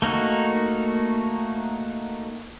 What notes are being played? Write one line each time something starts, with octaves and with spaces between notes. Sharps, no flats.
A3 A#3 D#4 F#4